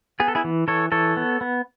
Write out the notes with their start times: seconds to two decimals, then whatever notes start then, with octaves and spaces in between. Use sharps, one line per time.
0.20 B3 G#4
0.28 A4
0.35 E4 G#4
0.44 E3
0.68 E3 A4 C#5
0.92 E3 A4 C#5
1.17 B3
1.41 B3